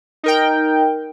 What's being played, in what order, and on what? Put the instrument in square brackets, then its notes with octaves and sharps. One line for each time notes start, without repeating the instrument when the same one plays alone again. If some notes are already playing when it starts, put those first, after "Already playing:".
[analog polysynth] D#4 A#4 G5